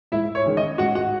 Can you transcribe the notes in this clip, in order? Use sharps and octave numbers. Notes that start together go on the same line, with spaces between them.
G#2 E4 E5
C#5
D#3 G#3 C#4
D#5
G#2 F#4 F#5
F#4 F#5